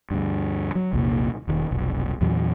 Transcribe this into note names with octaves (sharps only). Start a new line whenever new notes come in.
D2 G2
F#3
A#1 E2 C3 A#3
E1 D#3
F1 B1
E2 A#2 E3 F#3